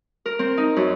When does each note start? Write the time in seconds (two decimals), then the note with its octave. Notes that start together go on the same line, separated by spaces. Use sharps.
0.26 A#4
0.39 C4
0.57 D#4
0.76 F#2